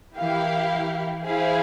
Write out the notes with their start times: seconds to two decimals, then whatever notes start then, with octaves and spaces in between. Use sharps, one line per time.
0.17 E3 E4 G4 A#4 F5
0.72 E3
1.25 E3 E4 G#4 C5 F5